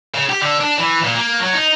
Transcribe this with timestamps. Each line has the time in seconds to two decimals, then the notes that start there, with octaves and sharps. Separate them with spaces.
0.15 C#3
0.30 G4
0.42 D3
0.60 D4
0.78 E3
1.02 A#2
1.15 A#3
1.40 F#3
1.53 D#4